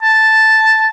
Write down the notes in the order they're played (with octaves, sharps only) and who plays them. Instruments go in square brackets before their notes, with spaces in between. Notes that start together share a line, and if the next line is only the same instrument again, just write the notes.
[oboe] A5